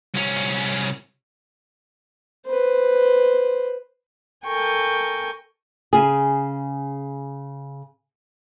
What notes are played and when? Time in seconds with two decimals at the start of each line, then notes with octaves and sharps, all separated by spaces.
0.14 C2 C#4
2.46 B4 C5
4.47 A4 A#4 G5 G#5 C#6
5.93 C#3 G#4